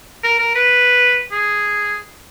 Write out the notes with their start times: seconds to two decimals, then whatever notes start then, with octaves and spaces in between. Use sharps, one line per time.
0.24 A#4
0.38 A#4
0.55 B4
1.32 G#4